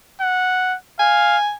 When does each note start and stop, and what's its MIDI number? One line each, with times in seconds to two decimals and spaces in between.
0.21 0.76 78
0.99 1.37 77
0.99 1.53 80